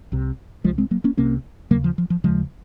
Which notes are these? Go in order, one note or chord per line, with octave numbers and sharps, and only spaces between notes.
C2 C3
C2 C3 F3 G#3
G#3 C4
F#3 A#3
A#3 C#4
C2 C3 A#3 C#4
D#2 C#3 F#3 A#3
F3
F3
F3
D#2 C#3 F3 G#3